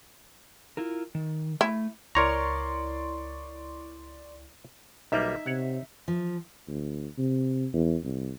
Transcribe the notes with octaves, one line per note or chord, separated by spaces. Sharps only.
E4 F4 A#4
D#3
A3 E4
C#2 E4 A#4 C#5 D5 A#5 C6 C#6
B1 G3 A#3 D#4 E5
C3 C#5 F#5
F3
D2
C3
E2
C2